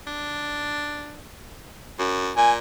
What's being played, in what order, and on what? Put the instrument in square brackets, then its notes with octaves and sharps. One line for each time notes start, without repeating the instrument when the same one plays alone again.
[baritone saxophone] D4
F#2
[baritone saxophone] A#2 [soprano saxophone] G#5